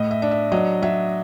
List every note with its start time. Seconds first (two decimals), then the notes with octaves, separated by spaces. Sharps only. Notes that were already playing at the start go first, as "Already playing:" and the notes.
Already playing: A2 D#5
0.11 E5
0.22 D4
0.31 E5
0.52 F#3 D#5
0.82 F#3 E5